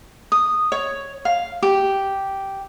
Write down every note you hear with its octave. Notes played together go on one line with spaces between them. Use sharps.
D#6
C#5
F5
G4